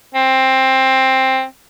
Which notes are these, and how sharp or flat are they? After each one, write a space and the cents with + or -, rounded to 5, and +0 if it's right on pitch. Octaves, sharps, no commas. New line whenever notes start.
C4 +10